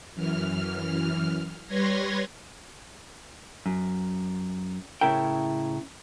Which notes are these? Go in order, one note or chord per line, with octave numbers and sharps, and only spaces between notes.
F#2 E3 F6
G3 B4 C#5 C6 G#6 A#6
F#2
A2 C#3 E4 A#4 G5